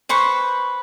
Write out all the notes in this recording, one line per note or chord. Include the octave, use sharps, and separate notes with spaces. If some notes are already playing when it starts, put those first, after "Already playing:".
B4 C5 C#6